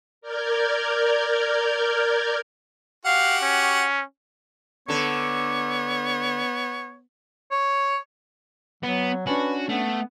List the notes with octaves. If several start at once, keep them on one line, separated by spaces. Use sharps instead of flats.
A#4 D5 F6 G6 G#6
F#4 G4 F5 F#5
C#4
D3 B3 A4 C#5
C#5
F#3 B3
C#4 D4 F#4 B4
A3 B3